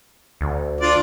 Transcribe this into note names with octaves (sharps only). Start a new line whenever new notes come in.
D2
D4 F4 D5